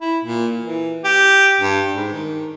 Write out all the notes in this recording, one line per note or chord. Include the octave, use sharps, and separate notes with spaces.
E4
A#2
E3
G4
G2
G#2
D#3